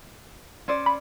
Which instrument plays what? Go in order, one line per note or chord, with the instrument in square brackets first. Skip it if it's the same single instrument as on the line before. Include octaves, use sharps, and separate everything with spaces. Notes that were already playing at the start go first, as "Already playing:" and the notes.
[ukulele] C#4 C5 D5
[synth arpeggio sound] B5